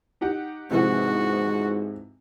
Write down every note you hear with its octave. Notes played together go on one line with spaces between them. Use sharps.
D#4 G4 F#5
G#2 C3 E3 F3 F#4